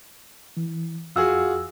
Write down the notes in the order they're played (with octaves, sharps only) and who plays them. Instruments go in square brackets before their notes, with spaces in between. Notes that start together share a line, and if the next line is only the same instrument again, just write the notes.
[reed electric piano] E3
[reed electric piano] F2 E6 [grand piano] F4 F#4 G#4